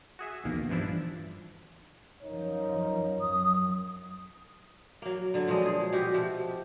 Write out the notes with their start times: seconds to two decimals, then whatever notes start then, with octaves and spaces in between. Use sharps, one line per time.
0.19 F#4 G#4 E5
0.44 A#1 D#2 B2 D#3 A#3
0.69 G2 E3 F3 D4 E4
2.23 F#2 F3 D#4 A#4 C#5
3.21 F#2 D#6
5.02 F#3 A#3
5.34 D3 F#3
5.47 A#2 F3 G#3 D#5
5.66 G#4
5.93 B2 F#4 G4
6.14 C3 F3